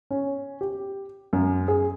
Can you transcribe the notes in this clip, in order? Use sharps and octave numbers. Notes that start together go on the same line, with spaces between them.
C#4
G4
F#2
G#4